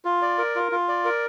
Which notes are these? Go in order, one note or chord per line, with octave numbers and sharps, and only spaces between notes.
F4
D5
A#4
F4
F4
D5
A#4